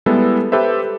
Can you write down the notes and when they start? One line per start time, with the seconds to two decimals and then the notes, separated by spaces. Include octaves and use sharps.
0.06 G3 G#3 B3 E4 A4
0.52 G4 A4 B4 C5 E5